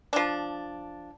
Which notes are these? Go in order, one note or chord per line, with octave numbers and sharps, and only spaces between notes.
F3 D4